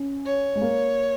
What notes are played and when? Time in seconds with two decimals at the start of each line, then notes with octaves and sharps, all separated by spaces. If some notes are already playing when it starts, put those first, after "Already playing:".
Already playing: C#4
0.25 C#5
0.55 G#3
0.61 A#3